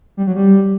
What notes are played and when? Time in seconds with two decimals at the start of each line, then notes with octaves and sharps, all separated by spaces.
0.17 G3
0.27 F#3
0.36 G3